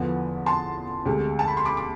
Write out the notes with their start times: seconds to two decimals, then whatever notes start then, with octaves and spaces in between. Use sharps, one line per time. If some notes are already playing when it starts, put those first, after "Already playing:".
Already playing: E2 D3 F3 B3
0.46 A5 C6
1.05 D2 C3 G#3
1.39 A5
1.48 B5
1.57 C6
1.65 B5 D6
1.77 D6